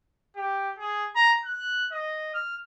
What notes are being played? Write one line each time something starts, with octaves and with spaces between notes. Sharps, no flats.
G4
G#4
A#5
F#6
D#5
F6